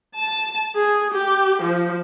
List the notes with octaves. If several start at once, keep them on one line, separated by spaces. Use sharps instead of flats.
A5
G#4
G4
F3